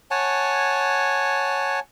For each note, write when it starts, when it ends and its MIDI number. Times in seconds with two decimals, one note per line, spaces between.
0.11 1.80 73
0.11 1.80 78
0.11 1.80 80
0.11 1.80 81